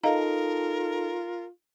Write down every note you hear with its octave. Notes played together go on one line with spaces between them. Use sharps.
D#4 F4 A4 A#4 D#5 F5 A#5